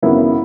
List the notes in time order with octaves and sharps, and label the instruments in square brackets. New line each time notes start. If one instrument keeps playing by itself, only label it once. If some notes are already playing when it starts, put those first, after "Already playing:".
[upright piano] G#1 F#2 C#3 E3 B3 E4